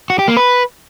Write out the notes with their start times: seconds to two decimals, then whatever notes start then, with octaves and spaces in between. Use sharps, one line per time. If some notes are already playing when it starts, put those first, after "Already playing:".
0.10 F#4
0.19 G4
0.28 A#3
0.37 B4